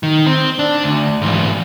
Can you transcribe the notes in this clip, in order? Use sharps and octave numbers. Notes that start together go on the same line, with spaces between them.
D#3
C4
D4
D2
G#2 E3